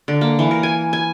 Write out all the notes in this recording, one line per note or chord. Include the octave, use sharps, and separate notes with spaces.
D3
A#3
E3
A#4
G#5
G#5